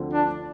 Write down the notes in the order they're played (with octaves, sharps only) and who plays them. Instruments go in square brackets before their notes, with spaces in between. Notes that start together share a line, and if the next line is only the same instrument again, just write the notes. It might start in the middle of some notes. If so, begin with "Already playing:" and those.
Already playing: [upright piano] D2 D3 F3 C4 F4
[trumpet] D4